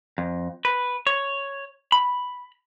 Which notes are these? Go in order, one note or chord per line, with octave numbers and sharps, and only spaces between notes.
F2
B4
C#5
B5